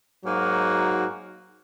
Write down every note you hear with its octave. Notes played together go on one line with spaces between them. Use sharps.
G#2 F#3 A#3 D#4 F#4